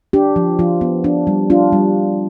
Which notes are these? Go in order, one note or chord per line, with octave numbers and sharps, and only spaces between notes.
D4 G4
F3
F3 F4
B3
D4
G3
D4 F4
G3